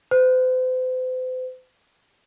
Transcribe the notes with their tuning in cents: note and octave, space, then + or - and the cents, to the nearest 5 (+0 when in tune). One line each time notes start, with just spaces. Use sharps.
C5 -40